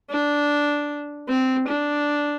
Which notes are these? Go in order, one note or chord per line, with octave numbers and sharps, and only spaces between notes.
D4
C4
D4